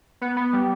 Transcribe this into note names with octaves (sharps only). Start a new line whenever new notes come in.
B3
B3
G3